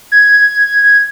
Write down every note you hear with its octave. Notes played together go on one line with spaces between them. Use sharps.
G#6